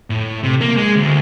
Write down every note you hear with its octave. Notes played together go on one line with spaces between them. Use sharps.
A2
C3
A#3
G#3
D2